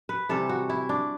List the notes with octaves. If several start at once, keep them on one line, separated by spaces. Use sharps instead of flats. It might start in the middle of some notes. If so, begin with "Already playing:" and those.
B4
C3 E3 G3 A4
F#4
E4
D4